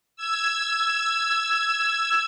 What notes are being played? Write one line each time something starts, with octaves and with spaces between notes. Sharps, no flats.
E6 G#6